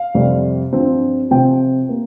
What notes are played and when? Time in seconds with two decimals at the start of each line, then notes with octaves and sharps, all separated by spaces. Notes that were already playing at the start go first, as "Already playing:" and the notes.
Already playing: F5
0.15 F2 C3 G3 C4
0.73 G2 F3 C4
1.31 C3 F3 C4 G5
1.89 A#3